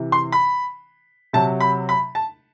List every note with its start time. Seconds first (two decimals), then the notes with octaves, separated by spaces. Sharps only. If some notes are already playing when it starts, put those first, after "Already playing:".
Already playing: C3 E3
0.12 C6
0.32 B5
1.33 C3 F#3 A5
1.60 B5
1.89 B5
2.15 A5